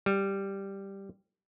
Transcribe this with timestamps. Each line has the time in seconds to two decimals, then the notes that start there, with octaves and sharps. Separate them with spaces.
0.06 G3